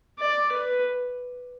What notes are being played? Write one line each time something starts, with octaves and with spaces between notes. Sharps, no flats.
D5
B4